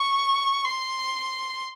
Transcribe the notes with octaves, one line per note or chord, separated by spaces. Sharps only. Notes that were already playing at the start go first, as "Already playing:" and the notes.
Already playing: C#6
C6